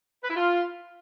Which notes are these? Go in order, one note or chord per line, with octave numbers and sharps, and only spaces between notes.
B4
E4
F4